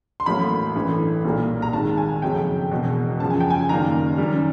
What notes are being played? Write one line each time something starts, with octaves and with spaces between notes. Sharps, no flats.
C6
A1 A2 F#3 A#3 B5
A1 G2 E3 A3
B1 A#2 G3 A#3
A#5
G#1 G#2 D#3 A5
G#5
F#1 F2 C#3 F#3 G5
E1 E2 B2
F#2 C#3 F3 A5
G#5
G5
G#5
F#1 F#2 D#3 G3 A#3 A#5
F#2 D#3 G3